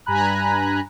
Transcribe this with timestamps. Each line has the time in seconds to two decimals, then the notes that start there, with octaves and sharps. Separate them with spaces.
0.06 G2 G#5 A#5 B5 F#6